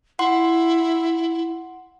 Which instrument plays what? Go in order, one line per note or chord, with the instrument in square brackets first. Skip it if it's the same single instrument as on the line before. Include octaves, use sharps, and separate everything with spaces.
[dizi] E4 [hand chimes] F#5 C6